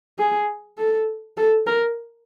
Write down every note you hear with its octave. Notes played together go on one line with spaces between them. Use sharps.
G#4
A4
A4
A#4